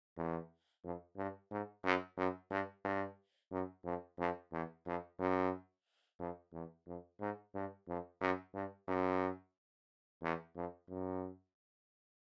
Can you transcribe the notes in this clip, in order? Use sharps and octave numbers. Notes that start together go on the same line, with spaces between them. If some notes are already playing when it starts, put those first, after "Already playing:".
E2
F2
G2
G#2
F#2
F#2
G2
G2
F#2
F2
F2
E2
F2
F#2
F2
E2
F2
G#2
G2
F2
F#2
G2
F#2
E2
F2
F#2